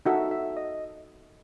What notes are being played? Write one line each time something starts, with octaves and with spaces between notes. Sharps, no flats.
D#4 F#4 A4 E5
E5
D#5